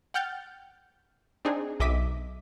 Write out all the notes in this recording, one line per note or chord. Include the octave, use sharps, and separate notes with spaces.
F#5 G5 F6 G6 A6
C4 D4 D#4 G#4
B1 D#5 E5 D6 B6 D#7